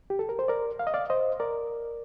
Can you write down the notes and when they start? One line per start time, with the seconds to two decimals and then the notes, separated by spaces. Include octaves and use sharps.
0.10 G4
0.19 A4
0.29 A#4
0.39 C5
0.48 A#4 D5
0.79 F5
0.87 D#5
0.94 D5 F5
1.10 C5 D#5
1.40 A#4 D5